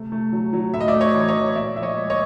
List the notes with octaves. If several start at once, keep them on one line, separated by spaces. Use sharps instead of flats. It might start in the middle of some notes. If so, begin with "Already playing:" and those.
Already playing: C3 A3
A3
F#3
F#3
A2 E5
D#5
D5 E5
A3
C#5 D#5
E3
C#5 D#5
E3
A#2 D5 E5
F3 E5
C#5 D#5
G#3
C#5 D#5